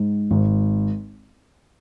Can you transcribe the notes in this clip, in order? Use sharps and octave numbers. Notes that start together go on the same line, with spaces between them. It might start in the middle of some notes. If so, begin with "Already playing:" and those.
Already playing: G#2
G#1